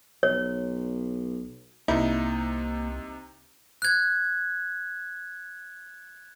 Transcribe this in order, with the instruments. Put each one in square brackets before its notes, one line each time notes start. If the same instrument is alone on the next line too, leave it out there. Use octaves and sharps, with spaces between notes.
[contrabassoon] B1 [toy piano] C#5
[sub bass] C2 [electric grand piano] C3 D#4 [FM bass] A#3 [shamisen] E4
[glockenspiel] F#6 G#6